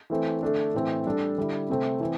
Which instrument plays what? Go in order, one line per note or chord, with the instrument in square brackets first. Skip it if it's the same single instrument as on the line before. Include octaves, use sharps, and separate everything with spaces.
[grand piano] E3 A3 C4
D3 A3 D4 A4
A2 E3 A3 C4 A4
G3 D4 A4
D3 G3 E4
C3 A3 C4
E3 C4